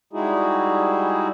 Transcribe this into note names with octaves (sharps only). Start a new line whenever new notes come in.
G3 G#3 D#4 E4 F#4 G#4